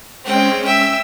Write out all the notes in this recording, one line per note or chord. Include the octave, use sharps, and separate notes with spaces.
G#3 C4 C#4 G5
E5 G5 E6